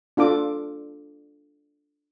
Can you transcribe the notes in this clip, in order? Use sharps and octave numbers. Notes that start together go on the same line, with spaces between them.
D4 F4 A4 D6